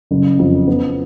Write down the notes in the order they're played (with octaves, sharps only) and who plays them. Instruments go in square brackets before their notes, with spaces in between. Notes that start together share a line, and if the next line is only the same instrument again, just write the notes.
[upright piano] F#1
F2
B3